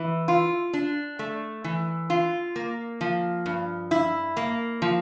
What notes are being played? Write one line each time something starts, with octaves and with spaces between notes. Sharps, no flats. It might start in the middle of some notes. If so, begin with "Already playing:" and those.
Already playing: E3
F4
D4
A3
E3
F4
A#3
F3
G2
E4
A#3
F3